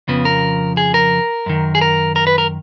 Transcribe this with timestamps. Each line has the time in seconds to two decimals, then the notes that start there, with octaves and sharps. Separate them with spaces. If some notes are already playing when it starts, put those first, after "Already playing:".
0.08 F2 C#3 F3 B3
0.25 A#4
0.77 G#4
0.94 A#4
1.46 F#2 D#3
1.75 G#4
1.81 A#4
2.16 A#4
2.27 B4
2.38 A#4